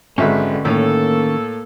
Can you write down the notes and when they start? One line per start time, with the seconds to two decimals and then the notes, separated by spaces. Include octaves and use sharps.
0.18 G#1 D3 G#3 C#4 G4 B4 E5
0.65 A2 D#3 A#3 C#4 A4